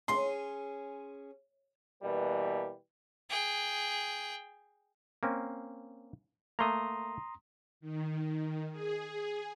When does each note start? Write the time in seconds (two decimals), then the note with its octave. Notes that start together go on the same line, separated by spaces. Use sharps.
0.08 C#4 G#4 C6
2.03 B2 E3 G3 A#3
3.30 G#4 G5
5.23 A#3 C4 C#4
6.59 A3 A#3 A#5 C6 D#6
7.81 D#3
8.71 G#4